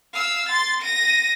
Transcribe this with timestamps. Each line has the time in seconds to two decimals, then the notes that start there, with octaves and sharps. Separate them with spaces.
0.13 F5 E6
0.48 C6 A6
0.81 A#6 D#7